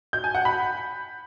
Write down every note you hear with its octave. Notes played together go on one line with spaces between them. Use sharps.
G6
G#5
F#5
B5